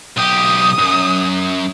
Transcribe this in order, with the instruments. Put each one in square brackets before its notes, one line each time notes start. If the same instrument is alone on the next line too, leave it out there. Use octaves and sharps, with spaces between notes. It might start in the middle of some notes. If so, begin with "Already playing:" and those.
[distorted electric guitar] B1 G4 [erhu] D#6
[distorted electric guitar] F#2